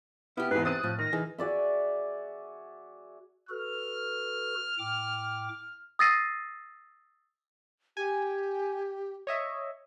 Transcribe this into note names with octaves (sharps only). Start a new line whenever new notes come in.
B3 E4 G4 F6
E2 G#2 B4 C7
C4 D#6 F#6 A6 D#7
A2 F3
D#3 F6 A#6
E3 D#4 G#4
F#4 G#4 D5 E5
F#4 A4 B4 F6
A2 G5 D6
D#6 E6 A6 A#6 C7 D#7
G4 G#5
C#5 D#5 E5